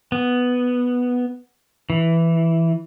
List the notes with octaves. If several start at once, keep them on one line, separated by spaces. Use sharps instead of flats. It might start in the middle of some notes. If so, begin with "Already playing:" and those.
B3
E3